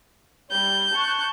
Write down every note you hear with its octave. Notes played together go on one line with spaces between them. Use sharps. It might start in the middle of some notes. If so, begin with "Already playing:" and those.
G3 G6
A5 C#6 F#6